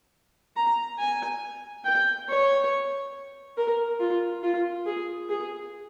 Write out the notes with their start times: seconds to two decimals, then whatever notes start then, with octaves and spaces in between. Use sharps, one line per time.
0.56 A#5
0.99 G#5
1.85 G5
2.28 C#5
3.56 A#4
3.99 F4
4.43 F4
4.86 G#4
5.29 G#4